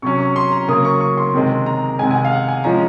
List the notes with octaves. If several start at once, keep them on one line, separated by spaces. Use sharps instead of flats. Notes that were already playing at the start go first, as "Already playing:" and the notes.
C3 F#3 C#4 C#6
C#6
C6
A#5
C#3 F#3 A#3 C#4 D#6
C#6
C#6
C6
C3 D#3 G#3 C4
A#5
C3 D#3 G#3 G#5
G#5
F#5
F5
F#5
G#5
F3 G#3 C#4 A#5